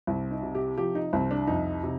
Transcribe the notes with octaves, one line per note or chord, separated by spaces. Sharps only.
C2 C4
D#4
C3
G4
F3 G4
D#4
C2 C4
D4
F2 D#4
C3